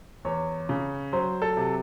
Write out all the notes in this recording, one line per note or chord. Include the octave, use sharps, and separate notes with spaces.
E2 C#5
C#3
F#3 C5
A4
C3